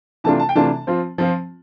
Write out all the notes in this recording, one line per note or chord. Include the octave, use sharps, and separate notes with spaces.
C3 E3 A3 D4 F4 A5
A5
G5
C3 E3 A3 D4 F4 A5
F3 C4 F4
F3 C4 F4